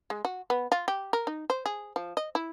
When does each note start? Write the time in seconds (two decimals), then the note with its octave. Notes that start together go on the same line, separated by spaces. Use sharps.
0.10 G#3
0.25 F#4
0.50 B3
0.72 F4
0.88 G4
1.13 A#4
1.27 D#4
1.50 C5
1.66 G#4
1.96 F3
2.17 D#5
2.35 E4